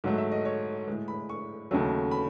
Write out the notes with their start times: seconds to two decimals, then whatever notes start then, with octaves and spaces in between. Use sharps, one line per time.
0.04 G#2 F#3 A3 F#4
0.18 E5
0.32 D#5
0.45 C#5
0.87 A2 G#3
1.08 B5
1.29 C#6
1.71 D#2 C#3 F#3 A3
2.11 B5